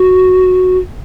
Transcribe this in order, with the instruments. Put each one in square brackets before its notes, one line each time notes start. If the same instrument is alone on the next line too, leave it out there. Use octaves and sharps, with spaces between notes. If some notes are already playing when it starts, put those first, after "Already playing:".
Already playing: [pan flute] F#4